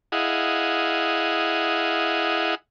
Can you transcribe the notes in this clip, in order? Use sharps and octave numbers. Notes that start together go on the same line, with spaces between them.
E4 G#4 D#5 F5 F#5